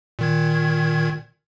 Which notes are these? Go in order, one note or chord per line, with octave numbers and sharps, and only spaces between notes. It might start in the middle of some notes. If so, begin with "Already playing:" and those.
A#2 D#3 G#6